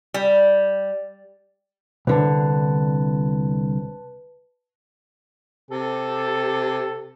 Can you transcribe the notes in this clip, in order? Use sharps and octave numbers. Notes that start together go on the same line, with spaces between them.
G3
C2 D3 B4 A5
C3 G4 A4